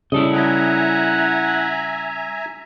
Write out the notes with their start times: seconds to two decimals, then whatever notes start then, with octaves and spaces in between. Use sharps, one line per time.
0.12 C#3 G3 E4 A4 D#5
0.33 E5 F#5 G#5 A#5